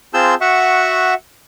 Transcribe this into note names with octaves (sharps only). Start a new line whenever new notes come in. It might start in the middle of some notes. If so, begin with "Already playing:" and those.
C4 F4 G#4 A5 E6 G6
F#4 E5 F#5 C#6